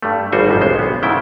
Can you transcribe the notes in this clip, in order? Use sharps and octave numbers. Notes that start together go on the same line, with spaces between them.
G2 G3 A3
G#1 G3 F#4 C5 G#5
G1 F2 C#3 B3 C5
B1 G#3 C5
B3
G#2 C#3 E3 E4 G5